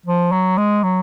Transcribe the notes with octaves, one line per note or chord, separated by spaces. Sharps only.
F3
F#3
G#3
F#3